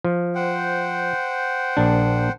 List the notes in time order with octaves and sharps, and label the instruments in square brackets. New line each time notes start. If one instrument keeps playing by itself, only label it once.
[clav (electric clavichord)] F3
[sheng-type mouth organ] C5 F#5 G5
[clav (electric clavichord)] A#1 D4